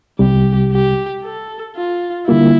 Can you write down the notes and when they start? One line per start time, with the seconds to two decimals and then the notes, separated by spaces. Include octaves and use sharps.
0.19 C2 C3 G3 G4
0.72 G4
1.24 A4
1.76 F4
2.27 D3 G3 A#3 E4 F4